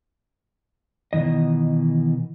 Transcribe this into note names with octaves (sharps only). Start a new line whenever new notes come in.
B2 D#3 E3 D#5